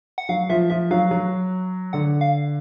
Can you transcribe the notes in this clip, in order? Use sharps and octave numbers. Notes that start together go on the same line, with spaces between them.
F#5
F#3 F5
F3 E5
F3 E5
F#3 F5
F#3
D3 F#5
F5